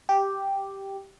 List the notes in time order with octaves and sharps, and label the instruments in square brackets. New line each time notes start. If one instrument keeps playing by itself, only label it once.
[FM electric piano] G4